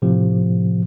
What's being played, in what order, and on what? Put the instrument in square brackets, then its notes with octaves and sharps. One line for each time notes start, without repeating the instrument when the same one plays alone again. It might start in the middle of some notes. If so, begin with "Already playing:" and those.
[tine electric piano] A2 C3 F3